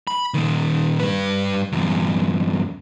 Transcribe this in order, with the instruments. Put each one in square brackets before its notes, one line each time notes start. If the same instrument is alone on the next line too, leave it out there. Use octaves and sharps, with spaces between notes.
[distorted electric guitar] B5
A#2 D#3
G2 B4
E2 G2